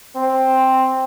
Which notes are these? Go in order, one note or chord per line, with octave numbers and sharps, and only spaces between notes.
C4